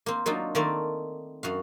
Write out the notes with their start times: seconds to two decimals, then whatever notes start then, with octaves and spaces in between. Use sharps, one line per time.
0.06 A#3 C4
0.26 F#3 A#3 C4 D4 D#4 F4
0.55 D#3 A3 A#3 C4 A#4 D5
1.43 F#2 F#4 F5